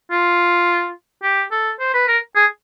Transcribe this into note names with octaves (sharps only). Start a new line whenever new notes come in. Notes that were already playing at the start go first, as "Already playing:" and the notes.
F4
G4
A4
C5
B4
A#4
G#4